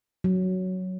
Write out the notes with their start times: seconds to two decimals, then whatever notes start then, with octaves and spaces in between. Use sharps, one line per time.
0.24 F#3